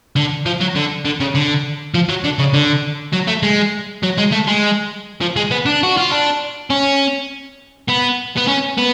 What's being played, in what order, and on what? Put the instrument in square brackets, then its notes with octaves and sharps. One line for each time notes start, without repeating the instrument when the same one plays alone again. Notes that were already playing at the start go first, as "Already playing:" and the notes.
[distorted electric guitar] D3
F3
F#3
D3
D3
C#3
D3
F3
F#3
D3
C#3
D3
F#3
A3
G#3
F#3
G#3
A3
G#3
F3
G#3
B3
D4
F#4
F4
D4
C#4
B3
B3
C#4
B3